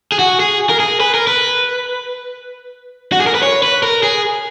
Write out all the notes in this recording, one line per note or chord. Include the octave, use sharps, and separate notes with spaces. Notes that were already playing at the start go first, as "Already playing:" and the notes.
G#4
F#4
G#4
A#4
G#4
B4
A#4
B4
F#4
G#4
A#4
B4
C#5
B4
A#4
G#4